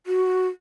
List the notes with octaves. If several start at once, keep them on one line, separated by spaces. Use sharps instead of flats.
F#4